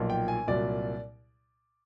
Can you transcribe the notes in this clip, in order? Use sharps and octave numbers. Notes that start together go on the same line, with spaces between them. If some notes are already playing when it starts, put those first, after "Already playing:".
Already playing: B1 A#2 F3
G5
G#5
C2 A#2 F#3 D5